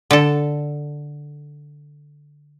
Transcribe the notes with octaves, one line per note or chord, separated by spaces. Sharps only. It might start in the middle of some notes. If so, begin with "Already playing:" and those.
D3 A4